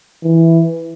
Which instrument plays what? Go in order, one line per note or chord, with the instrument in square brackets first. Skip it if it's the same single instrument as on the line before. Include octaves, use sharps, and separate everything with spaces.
[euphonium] E3